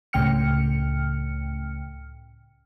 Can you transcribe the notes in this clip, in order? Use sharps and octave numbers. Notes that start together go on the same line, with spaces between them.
C#2 A2 C#3 G5 F6 C#7